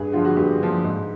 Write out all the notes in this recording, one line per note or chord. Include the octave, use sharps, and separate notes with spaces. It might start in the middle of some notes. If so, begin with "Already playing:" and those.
Already playing: G2 G#4
D3 F3 F4
F#4
G2 G4
D3 F3
G#2